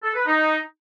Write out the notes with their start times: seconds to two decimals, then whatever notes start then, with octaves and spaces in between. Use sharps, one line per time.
0.03 A4
0.15 B4
0.26 D#4